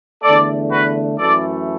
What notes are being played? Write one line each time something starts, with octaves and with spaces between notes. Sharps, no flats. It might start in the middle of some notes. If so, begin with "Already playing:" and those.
E2 D3 A3 A4 D5
F#4 B4
F#2 E3 A3 A4 D5